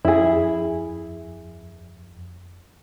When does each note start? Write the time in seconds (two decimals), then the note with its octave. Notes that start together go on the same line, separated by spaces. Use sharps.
0.05 F2 E4 G#4